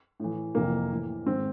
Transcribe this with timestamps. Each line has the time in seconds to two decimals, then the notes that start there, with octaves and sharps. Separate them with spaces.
0.20 A2 E3
0.55 F2 C3 E3 A#3
0.92 A2 E3
1.26 G#2 D#3 C4